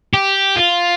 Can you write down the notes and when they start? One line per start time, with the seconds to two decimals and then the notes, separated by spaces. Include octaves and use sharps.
0.14 G4
0.56 F4